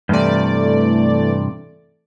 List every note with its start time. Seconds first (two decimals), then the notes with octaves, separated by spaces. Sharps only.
0.09 G2 C3 E3 A3 D5